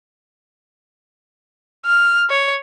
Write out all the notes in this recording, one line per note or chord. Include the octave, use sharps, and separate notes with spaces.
F6
C#5